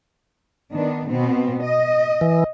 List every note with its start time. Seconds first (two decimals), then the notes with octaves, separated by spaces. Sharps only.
0.72 D#3 B3 D4
1.09 B2 B3 C4
1.63 D#5
2.21 E3